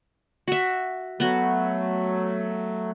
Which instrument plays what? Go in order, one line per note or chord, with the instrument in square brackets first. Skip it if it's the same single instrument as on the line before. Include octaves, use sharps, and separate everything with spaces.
[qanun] F#4 E5
[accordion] F#3 A3 [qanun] B3 F#4